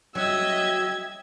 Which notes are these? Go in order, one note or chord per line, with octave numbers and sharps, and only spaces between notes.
F#3 D#5 E5 G5 E6 G#6